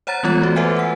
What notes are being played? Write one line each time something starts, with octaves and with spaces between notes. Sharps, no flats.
C5 C#5 F#5 A#5 A6
E3 G3 G#3 B3 F4 C#5
A3 F#4
A4 B4 C5 E5 F#5 G#5
B4 F#5